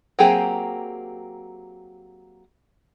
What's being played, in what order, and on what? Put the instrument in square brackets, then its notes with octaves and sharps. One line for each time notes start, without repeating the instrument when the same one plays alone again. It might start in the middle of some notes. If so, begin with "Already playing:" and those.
[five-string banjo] F#3 A#3 C4 G4 G#4